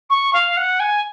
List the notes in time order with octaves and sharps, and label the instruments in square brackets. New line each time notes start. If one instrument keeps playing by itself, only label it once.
[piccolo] C#6
F5
F#5
G#5